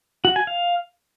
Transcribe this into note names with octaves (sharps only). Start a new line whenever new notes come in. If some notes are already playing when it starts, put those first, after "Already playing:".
F#4
G#5
F5